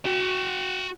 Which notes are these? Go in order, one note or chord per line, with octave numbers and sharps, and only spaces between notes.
F#4 G5